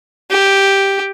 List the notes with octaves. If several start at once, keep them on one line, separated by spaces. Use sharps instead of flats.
G4